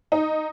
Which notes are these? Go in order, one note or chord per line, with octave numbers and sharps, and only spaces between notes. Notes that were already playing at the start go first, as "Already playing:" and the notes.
D#4